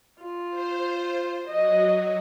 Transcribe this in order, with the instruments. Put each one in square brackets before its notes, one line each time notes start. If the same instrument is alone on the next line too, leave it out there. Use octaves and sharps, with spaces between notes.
[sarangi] F4
[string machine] C5
[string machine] F#3 [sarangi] D#5